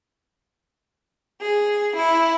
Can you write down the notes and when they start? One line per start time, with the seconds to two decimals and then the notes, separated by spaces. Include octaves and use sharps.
1.41 G#4
1.96 E4